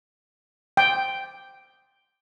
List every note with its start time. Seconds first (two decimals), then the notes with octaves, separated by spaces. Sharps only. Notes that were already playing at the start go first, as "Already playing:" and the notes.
0.77 G5